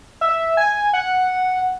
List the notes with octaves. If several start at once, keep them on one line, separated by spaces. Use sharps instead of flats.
E5
G#5
F#5